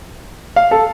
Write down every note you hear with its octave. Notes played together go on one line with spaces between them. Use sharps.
F5
A4